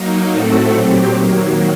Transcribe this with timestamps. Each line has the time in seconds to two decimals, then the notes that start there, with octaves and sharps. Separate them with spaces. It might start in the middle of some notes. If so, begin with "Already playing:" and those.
Already playing: F#3 A#3 D#4
0.31 A2 A3 C4 F#4 A4
0.71 A#2 F#3 C4 G4
1.12 D#3 F#3 A#3